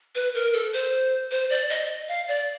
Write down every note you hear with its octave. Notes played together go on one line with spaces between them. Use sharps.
B4
A#4
A4
C5
C5
D5
D#5
F5
D5